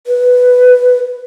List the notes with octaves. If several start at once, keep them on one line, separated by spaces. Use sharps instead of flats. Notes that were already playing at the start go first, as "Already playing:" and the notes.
B4